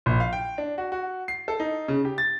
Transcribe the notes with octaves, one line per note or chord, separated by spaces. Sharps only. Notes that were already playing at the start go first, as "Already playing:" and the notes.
A#1
F5
G5
D4
F#4
F#4
C7
A4
D#4
C#3
G4
A6